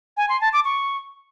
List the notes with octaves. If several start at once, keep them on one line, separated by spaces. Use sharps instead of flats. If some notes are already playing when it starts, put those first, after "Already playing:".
G#5
C6
A5
D6
C#6